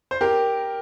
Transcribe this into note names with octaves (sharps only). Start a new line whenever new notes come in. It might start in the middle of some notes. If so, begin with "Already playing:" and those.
C5
G4 A#4